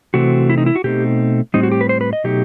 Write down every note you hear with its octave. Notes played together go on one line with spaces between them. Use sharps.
C3 E3 A3 C4 F#4
E4
D#4
E4
F#4
B2 A3 C4 D#4 G4
A2 G3 C4 D#4
F#4
G4
B4
C5
B4
D#5
B2 F#3 A3 D#4 G4